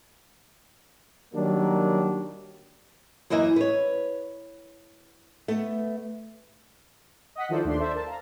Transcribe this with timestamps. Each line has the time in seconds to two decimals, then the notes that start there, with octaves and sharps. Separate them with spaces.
1.33 D#3 F#3 G3 A#3 D4
3.30 F#2 E3 A#3 D#5 E5
3.56 B4 C#5
5.48 A3 B3
7.35 D#5 F#5 B6
7.49 D#3 F3 E4 A4 C5 D5
7.64 D#2 A3 D4 C6
7.79 A4 C5 D5 E5 A5
7.94 A#4 A5
8.06 F5 A#5